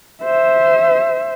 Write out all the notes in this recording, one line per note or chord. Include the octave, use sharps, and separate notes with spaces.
C5 E5